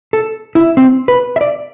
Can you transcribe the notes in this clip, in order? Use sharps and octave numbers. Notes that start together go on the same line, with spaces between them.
A4
E4
C4
B4
E5
D5